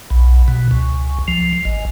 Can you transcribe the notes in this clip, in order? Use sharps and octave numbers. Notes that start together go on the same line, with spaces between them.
B1
B2
C#2
F3
G#1